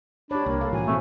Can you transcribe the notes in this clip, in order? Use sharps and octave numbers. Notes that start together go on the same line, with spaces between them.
D4 G4 C#5 B5
C2 A#3
A4 F5
A2 E3 F3 F#4 G#5
B2 A3 C4